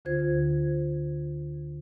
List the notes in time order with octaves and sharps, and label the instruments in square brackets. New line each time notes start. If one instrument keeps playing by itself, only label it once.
[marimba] D2 D3 F4 C5 G#6